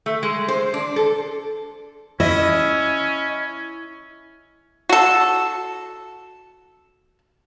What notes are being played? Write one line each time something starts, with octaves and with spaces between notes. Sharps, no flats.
A3
G#3
C5
D4
A4
C#4 E4 D#5
F#4 A4